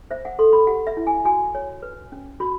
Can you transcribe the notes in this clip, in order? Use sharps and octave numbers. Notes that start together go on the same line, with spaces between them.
C5 E5
F#5
A4 C6
B5
G4 F#5
E5
E4
G#5
F#4 G#5
C#5
B4
C#4
F#4 B5